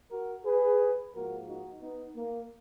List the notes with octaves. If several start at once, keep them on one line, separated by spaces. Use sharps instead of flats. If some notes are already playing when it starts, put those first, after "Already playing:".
F#4 A#4
G#4 B4
G#2 F3 A#3 F#4 A#4
D#4 F#4
B3 D#4
A#3